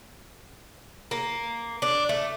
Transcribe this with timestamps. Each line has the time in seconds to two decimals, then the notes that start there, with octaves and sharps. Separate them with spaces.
1.11 A#3
1.82 D4
2.09 A3